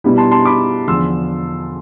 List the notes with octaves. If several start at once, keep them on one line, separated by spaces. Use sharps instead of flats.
B2 G3 B3 E4
A5 C6
A5 C6
B5 D6
E2 D3 F3 C6 E6